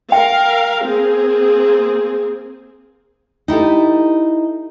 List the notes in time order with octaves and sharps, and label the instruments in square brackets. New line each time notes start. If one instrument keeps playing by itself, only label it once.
[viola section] A#4 F5 [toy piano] G5
[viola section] A#3 C4 G#4
[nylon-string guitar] D#4 E4 G4 A4